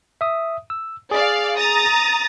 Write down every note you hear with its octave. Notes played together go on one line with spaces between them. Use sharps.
E5 D#6
E6
G#4 D5 F5
A#5 D#6 A6